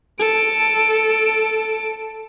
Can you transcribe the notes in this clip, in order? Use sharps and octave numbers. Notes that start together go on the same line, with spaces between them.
A4 D7